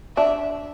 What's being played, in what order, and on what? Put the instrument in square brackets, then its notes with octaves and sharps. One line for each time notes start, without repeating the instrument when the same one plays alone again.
[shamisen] D4 [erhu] E5